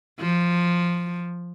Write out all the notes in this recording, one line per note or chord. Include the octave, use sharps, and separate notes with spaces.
F3